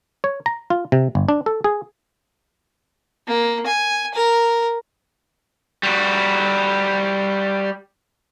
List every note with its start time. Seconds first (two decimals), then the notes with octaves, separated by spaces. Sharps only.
0.24 C#5
0.46 A#5
0.70 F4
0.92 C3
1.15 G1
1.29 D4
1.46 A4
1.64 G#4
3.27 A#3
3.66 G#5
4.14 A#4
5.83 G3 F#4